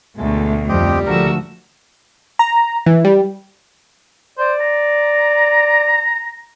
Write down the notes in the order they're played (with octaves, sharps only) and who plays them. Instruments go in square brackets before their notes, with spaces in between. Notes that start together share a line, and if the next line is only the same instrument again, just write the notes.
[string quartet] D2 B2 [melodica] G#3 A3
[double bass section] F2 [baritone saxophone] G3 [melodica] C4 G4 D#5
[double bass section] D3 F3 A3 [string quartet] F#4 E6 [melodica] A#4
[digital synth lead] A#5
E3
G3
[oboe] C5 [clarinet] D5
[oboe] A#5